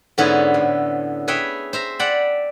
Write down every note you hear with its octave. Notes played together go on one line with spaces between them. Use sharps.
G#2 D3 B3 C#4 E4
A2
G#4 B4 C#5 E5 G5
C5 E5 A#5
D5 F#5 G5 A5 B5